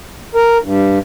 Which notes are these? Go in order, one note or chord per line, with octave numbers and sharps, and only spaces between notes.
A#4
G2